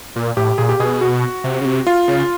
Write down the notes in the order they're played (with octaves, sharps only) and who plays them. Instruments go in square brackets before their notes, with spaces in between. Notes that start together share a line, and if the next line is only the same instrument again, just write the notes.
[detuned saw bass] A#2
[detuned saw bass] A2 [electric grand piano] G4
[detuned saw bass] A#2 [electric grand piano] G#4
[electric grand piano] G4
[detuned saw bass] B2 [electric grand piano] G#4
[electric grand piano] F#4
[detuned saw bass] C3
C#3
C3
[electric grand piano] F4
[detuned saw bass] C#3